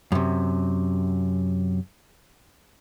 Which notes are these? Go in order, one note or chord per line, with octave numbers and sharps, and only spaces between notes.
F#2 C3